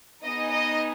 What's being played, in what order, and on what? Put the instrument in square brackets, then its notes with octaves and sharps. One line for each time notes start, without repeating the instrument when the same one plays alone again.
[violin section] B3 D#4 G#4 D#5
D#5